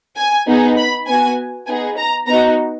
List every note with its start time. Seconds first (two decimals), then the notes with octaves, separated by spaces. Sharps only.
0.17 G#5
0.47 B3 D#4 G#4
0.77 B5
1.07 B3 F#4 G#5
1.67 B3 D#4 G#4 G#5
1.97 A#5
2.27 B3 D#4 F#4 A#5